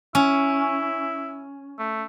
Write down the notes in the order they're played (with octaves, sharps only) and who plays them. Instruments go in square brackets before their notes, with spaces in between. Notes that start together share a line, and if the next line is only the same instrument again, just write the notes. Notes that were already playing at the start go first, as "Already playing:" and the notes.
[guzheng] C#4 [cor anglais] E4
[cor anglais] A3